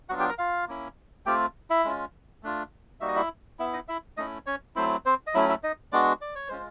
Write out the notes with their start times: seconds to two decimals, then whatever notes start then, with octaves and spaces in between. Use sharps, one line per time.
0.09 F#3 B3 D4 F4 F#4 F#5
0.19 G4 G5
0.29 A#4 A#5
0.38 F4 F5
0.68 A#3 C#4 E4
1.26 A3 C4 F4 G4 G5
1.70 E4 E5
1.85 G#3 C#4 F4
2.43 A3 D4 F4
3.01 G3 A#3 D#4 F#4 E5
3.08 D#5
3.16 E4 E5
3.59 B3 E4 E5
3.73 D#4 D#5
3.88 E4 E5
4.17 A3 C#4 D#4 E4 D#5
4.46 C#4 C#5
4.76 F#3 A3 C4 E4 C5
5.06 C4 C5
5.27 D#5
5.34 F#3 A3 C#4 E4 E5
5.49 E4 E5
5.63 D#4 D#5
5.92 G#3 B3 D4 F#4 D5
6.21 D5
6.35 C#5
6.49 G#3 C#4 F4 C5